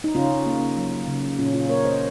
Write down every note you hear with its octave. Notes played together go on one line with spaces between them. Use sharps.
D#4
C#3 C#4 F4
A#3
F#3
C#3
A#2 C#4 F4
C#4 F4
A#3 A#4 C#5
C5 D#5